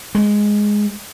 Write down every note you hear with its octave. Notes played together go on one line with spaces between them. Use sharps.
G#3